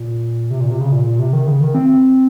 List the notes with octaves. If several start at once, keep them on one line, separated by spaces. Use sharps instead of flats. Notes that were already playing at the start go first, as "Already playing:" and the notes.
Already playing: A#2
C3
A#2
C3
C#3
A#2
A#2
C3
D#3
C#3
D#3
C4